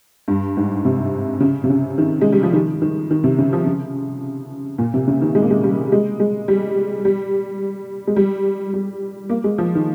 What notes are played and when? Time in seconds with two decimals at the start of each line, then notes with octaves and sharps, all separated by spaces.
0.28 G2
0.57 G#2
0.85 C3
1.40 C#3
1.64 C3
1.70 C#3
1.98 D#3
2.21 G#3
2.32 G3
2.43 F3
2.53 D#3
2.82 D#3
3.11 D#3
3.24 C3
3.38 C#3
3.53 F3
3.66 C#3
4.78 A#2
4.94 C3
5.07 C#3
5.22 D#3
5.35 G#3
5.42 A#3
5.51 G#3
5.64 G3
5.92 G#3
6.20 G#3
6.48 G3
7.05 G3
8.07 G#3
8.16 G3
8.74 G3
9.30 A#3
9.44 G#3
9.58 F3
9.75 D#3